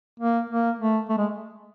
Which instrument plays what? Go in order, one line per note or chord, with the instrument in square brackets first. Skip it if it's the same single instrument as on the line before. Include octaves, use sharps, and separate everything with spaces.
[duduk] A#3
A#3
A3
A3
G#3